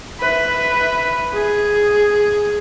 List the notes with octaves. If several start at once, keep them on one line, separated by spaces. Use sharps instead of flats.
B4 E5
G#4